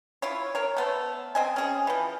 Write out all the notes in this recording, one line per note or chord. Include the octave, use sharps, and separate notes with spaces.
E4 F4 C#5
A#4 C#5
A3 B3 C5
C4 D#5 G#5
C#4 G#4
E3 F3